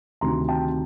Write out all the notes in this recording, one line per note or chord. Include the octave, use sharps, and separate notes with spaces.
D2 C3 D#3 A#5 C6
G5 A5